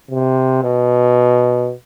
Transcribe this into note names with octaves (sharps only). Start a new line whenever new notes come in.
C3
B2